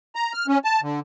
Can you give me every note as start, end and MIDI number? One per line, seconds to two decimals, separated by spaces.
0.16 0.33 82
0.33 0.46 89
0.48 0.58 61
0.64 0.81 81
0.82 1.00 50